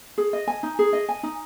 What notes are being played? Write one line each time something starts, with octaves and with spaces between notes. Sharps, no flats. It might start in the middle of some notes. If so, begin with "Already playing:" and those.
G#4
D#5
G#5
D#4
G#4
D#5
G#5
D#4